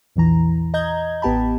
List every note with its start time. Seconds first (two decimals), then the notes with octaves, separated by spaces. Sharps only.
0.16 A#1 E2 E3 A#5
0.74 D#5 A#5 G6 G#6
1.22 A1 B3 G4 A5 B5